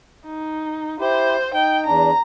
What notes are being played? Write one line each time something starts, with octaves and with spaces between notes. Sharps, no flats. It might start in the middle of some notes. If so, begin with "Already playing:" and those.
D#4
E4 G4 C5
D#4 G5
E2 D4 A#5